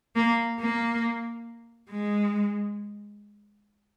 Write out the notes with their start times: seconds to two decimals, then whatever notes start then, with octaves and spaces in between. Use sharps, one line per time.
0.16 A#3
0.60 A#3
1.90 G#3